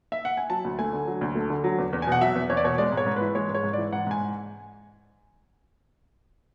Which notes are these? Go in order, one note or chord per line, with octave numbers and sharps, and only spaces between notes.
E5
F#5
G#5
F#3 A5
D2
A3 G#5
D3
F#3
D2
A3
D3
F#3
E2
E2
G#5
B2 F#5
F#3 E5
E2
E2 C#5
D5
B2 C#5
G#3 D5
G#2
C#5
G#2
E3 B4
G#3 C#5
G#2
C#5
G#2
E3 D5
G#2 F#5
G#2 G#5